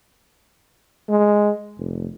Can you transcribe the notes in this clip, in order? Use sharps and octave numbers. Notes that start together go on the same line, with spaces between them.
G#3
F1